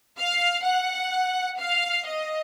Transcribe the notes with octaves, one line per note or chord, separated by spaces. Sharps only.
F5
F#5
F5
D#5